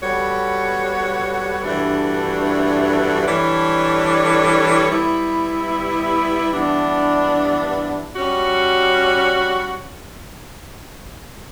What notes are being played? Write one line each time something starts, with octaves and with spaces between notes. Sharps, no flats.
G3 B3 F#4 A4 C#5
G2 E3 A3 D4 F#4
E3 G3 D4 A4 C#5
G3 B3 E4
G2 E3 B3 D4
G3 C#4 F#4